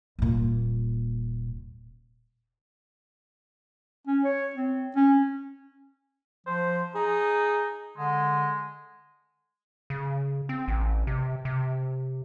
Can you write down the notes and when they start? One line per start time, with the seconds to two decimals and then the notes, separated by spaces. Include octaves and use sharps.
0.19 D#1 A#2
4.07 C#4
4.24 C#5
4.56 C4
4.96 C#4
6.47 F3 C5
6.95 D#4 G#4
7.98 D3 G#3
9.90 C#3
10.49 C4
10.68 A1
11.07 C3
11.45 C3